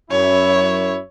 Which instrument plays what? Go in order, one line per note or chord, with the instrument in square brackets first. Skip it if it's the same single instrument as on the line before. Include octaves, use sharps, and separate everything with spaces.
[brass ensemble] F#2 E4 [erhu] C#5